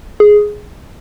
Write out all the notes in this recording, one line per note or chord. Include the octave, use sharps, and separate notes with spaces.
G#4